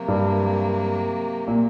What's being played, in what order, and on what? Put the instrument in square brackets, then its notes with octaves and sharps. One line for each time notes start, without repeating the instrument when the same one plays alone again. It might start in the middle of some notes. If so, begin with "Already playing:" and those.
Already playing: [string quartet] C3 F#3 A#3
[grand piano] G2
A#2